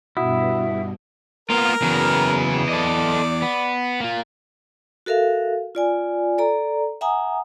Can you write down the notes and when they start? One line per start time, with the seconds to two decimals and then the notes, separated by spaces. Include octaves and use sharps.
0.17 G2 B2 E4 F#4 F#5 D#6
1.50 A#3 B3 F4 A#4
1.82 C#3 E3 F#3 B3
2.69 A4 D5 D#5
3.42 B3
4.00 A#3 F4
5.06 F#4 A4 A#4 E5 F5
5.75 F4 D5 G#5
6.38 A4 D5 A#5
7.01 E5 F#5 G#5 A#5 D#6